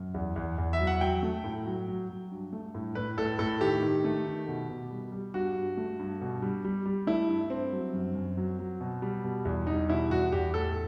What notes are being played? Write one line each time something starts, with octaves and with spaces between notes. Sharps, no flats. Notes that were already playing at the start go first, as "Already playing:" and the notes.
Already playing: F#2
E2
E2
E2
E5
F#3
F#5
F#3 G5
A3
A2
F#3
F#3
F#3
G2
A3
A2
A2 B4
A2 A4
A2 A4
D#3 G4
D#3
A3
D#3
B2
B2
G3
G3
G2 F#4
G2
A3
G2
B2
G3
G3
G3
A3 E4
G2
G2 C4
F#3
F#2
F#2
F#3
F#3
B2
G3
B2
E2
G3 D#4
B2 E4
E2 F#4
E2 G4
A2 A4